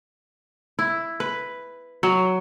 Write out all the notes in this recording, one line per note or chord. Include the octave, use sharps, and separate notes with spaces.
E4
B4
F#3